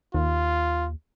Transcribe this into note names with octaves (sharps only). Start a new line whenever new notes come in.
D#2 F4